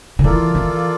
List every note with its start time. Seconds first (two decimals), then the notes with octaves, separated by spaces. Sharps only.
0.19 D3
0.24 E3 A#3 F4 A4 D5
0.55 E3